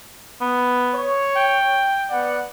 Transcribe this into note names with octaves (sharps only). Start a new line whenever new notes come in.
B3
C#5
G5
B3 D5 F#5